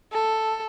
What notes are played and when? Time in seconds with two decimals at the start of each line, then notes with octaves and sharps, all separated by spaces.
0.12 A4